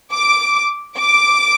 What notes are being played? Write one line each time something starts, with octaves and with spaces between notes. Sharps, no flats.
D6
D6